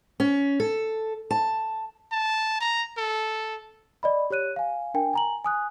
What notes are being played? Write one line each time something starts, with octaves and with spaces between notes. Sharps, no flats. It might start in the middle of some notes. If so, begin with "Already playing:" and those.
C#4
A4
A5
A5
A#5
A4
D5 D#5 B5
G4 C#5 F#6 D#7
F5 G#5
D4 A#4 G5 G#5
G#5 A#5 F#7
G#5 D#6 F#6